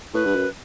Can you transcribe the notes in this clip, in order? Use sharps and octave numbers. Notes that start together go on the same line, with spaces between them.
A2 B4
G2
F#2